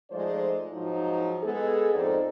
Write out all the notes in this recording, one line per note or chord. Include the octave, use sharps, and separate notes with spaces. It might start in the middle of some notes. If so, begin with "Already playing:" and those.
F3 G#3 A3 D#4 C5 D5
G#2 F3 F#3 D#4
G#3 B3 G#4 A4
F2 G#2 D#4 A4 C5 D5